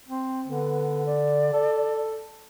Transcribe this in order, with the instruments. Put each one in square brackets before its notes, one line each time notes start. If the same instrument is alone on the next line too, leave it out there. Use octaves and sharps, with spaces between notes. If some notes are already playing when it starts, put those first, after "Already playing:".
[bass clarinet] C4
[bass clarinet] D3 [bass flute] B3
[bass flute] D5
[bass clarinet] A4